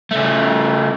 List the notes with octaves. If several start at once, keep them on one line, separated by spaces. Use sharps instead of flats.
C#3 A3